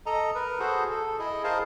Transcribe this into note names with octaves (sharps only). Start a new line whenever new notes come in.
A4 D#5 A#5
A#4 B4
F#4 G#4 A4 C5
A4
E4 G#4 D#5
G#4 A#4 C5 D#5 F5 A5